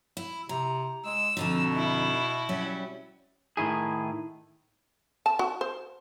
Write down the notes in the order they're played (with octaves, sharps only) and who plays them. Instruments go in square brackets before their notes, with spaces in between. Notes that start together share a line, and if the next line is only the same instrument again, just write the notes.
[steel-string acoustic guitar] E4
[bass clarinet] C3 [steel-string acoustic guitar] A#5
[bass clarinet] G#3 [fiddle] E6
[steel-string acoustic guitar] F2 D3 D#4 [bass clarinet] B2
[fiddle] E4
[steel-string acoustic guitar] F#3 G3 C#4
[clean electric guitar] A2 D#3 E4 G#4
[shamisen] A5
F#4
C5